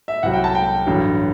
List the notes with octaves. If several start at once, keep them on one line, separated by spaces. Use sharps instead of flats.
E5
C2 C3 F#3 F#5
G5
A5
G5
A1 G2 D3 F#3